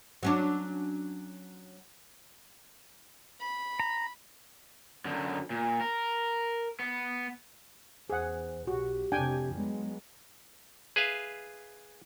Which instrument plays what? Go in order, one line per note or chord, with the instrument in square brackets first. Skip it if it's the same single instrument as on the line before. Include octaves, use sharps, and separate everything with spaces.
[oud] F#3 C#4 D4
[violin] B5
[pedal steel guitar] A#5
[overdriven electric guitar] F#2 D3
A#2
A#4
B3
[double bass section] E2 [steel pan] G#4 F#5 [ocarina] C5
[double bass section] B1 [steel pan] F#4 [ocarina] G4
[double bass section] F1 C3 [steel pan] D4 G5 G#5
[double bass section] F#3 G#3 B3
[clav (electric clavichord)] G#4 B4 E5 F5